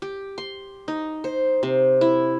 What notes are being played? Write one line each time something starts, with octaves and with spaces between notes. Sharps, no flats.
G4
C6
D#4
C5
C3
E4